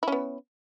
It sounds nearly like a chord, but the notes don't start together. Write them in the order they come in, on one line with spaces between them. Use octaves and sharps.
E4 C#4 B3